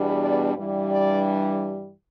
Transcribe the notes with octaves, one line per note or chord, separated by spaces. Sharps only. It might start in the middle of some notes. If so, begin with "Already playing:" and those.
Already playing: E2 B2 G3 D4
D5
G2 E3 G3 D4
D5